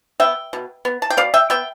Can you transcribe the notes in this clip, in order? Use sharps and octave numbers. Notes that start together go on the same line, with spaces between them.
B3 E5 G5
B2
B3
A5
G5
B2 D5 F5
E5 G5
B3 E5 G5